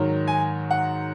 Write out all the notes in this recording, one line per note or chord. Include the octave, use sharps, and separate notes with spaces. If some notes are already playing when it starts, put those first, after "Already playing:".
Already playing: G#2 D#3 F#3
G#5
F#5